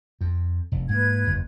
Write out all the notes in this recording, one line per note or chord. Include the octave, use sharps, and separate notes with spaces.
F2
F1
G#2 A#3 B4 G#6
F#1 E2